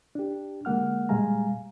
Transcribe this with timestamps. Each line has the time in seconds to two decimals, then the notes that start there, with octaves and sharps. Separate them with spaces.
0.15 D4 G4
0.65 D3 G#3 A#3 F#5 F6
1.09 A#2 G3 G#3 F5 G#5 A#5